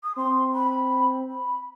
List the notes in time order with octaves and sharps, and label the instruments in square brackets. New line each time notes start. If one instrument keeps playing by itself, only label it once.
[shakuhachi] D#6
[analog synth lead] C4 [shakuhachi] C6
[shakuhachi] B5
B5